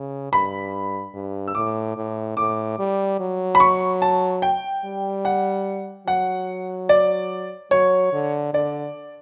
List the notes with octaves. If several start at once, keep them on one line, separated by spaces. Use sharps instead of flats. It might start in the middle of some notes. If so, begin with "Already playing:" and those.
Already playing: C#3
G2 B5
G2
E6
A2 D6
A2
A2 D6
G3
F#3
B5
C#6
A5
G5
G3
F#5
F#3 F#5
D5
F#3 C#5
D3
D3 D5